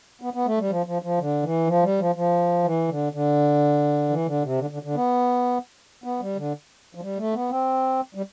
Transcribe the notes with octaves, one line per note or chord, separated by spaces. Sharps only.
B3
B3
A3
G3
F3
F3
F3
D3
E3
F3
G3
F3
F3
E3
D3
D3
E3
D3
C3
D3
D3
D3
B3
B3
G3
D3
F3
G3
A3
B3
C4
G3